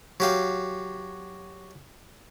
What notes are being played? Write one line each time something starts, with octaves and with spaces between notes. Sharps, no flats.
F#3 G4 F5